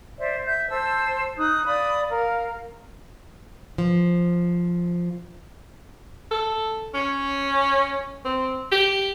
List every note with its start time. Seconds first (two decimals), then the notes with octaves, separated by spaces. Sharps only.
0.17 C5 D5 E5
0.44 E5 G6
0.69 A4 C5 E6
1.37 D#4 D#6 F#6
1.65 D5 F5 B5 D#6
2.08 A#4 F5
3.78 F3
6.31 A4
6.94 C#4
8.25 C4
8.72 G4